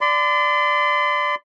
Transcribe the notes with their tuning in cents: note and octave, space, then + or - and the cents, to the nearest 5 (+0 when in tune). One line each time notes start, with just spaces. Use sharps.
D5 +0 C6 -40